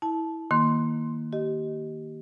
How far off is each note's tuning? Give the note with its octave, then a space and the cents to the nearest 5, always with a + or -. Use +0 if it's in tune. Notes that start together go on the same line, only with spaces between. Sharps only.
E4 -15 A5 -15
D#3 +0 A#3 +0 C6 +0
G4 -25 D#5 +0